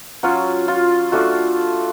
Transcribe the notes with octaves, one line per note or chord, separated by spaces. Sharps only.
F#3 C#4 F4 F#4
F4
A3 D4 F4 F#4